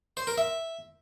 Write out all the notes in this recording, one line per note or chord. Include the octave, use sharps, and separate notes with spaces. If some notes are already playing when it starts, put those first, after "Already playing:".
C5
A#4
E5